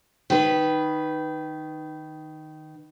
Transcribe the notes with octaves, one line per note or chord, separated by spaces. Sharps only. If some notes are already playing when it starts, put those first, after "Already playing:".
D#3 B4